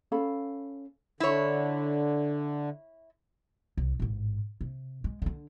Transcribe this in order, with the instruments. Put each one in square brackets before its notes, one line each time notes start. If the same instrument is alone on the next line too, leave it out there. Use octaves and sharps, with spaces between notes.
[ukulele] C#4 A4 F5 B5
[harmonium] D3 [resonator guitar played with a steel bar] E4 C#5
[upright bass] C2
A1 G#2
C3
G#3
D3 D4